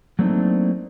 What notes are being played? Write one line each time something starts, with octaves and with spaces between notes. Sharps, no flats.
F#3 A3 A#3 C4 D4 D#4